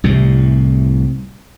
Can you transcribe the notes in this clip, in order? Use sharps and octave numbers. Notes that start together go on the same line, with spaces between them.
C2 A2 C3